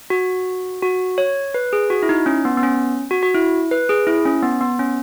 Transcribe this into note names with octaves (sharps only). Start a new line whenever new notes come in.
F#4
F#4
C#5
B4
G#4
F#4
E4
D#4
C#4
B3
B3
C#4
F#4
F#4
E4
B4
G#4
E4
C#4
B3
B3
C#4